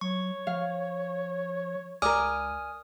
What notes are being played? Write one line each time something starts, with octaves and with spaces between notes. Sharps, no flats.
F#3 C#5 C#6
F3 F5
C#2 A#4 D5 G#5 D#6 F6